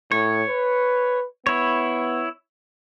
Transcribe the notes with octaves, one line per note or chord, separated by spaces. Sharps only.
A2 C#5
B4
B3 E4 C#5